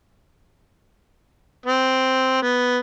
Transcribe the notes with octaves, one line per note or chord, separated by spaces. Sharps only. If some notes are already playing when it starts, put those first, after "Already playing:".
C4
B3